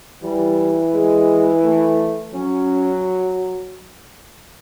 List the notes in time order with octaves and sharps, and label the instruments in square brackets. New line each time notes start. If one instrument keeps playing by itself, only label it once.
[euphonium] E3 [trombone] G3
[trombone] G#3
A3
[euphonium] F#3 [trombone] C#4